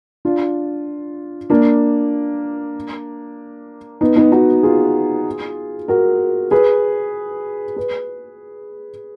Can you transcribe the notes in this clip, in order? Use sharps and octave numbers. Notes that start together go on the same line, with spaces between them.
D4 F4
A#3 D4
B3 D#4
B3 D#4
D#4 F#4
F4 G#4
F#4 A#4
G#4 B4
G#4 B4